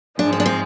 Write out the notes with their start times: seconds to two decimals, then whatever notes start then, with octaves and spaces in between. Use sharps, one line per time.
0.18 G#2 F3 G#3 D4
0.33 C4
0.40 D4
0.46 C4